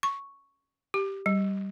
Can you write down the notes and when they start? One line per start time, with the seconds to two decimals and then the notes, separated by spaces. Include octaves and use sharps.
0.03 C#6
0.94 G4
1.26 G3